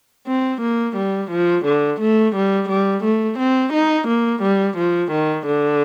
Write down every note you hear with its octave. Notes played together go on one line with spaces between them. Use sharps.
C4
A#3
G3
F3
D3
A3
G3
G3
A3
C4
D#4
A#3
G3
F3
D#3
D3